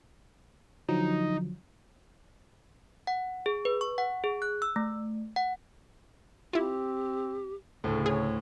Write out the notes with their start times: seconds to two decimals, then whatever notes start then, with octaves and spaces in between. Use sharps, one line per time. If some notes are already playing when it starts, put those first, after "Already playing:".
0.88 D3 F3 F#3 D#4
3.07 F#5
3.46 G#4
3.65 B4
3.81 C#6
3.98 F#5
4.24 G#4
4.42 F#6
4.62 E6
4.76 A3
5.36 F#5
6.53 C4 E4 F4 G4
7.84 D2 A2 C#3 A4
8.06 G#4 C#5